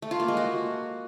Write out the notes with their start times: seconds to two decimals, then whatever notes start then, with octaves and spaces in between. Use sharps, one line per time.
0.02 A3
0.11 F4
0.20 A#3
0.28 G#3
0.37 F#4